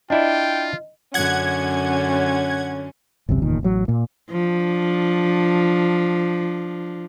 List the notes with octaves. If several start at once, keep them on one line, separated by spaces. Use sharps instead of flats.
D4 E4 F4 D5 D#5 G5
F#2 D3 C#4 F#5 G#6
G#1 C#2 F#2 C3
F#1 E2 A#2 D#3
A1 F#3
A#2 A#3
F3 D4